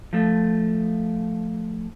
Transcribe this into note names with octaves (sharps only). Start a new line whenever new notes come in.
F3 A3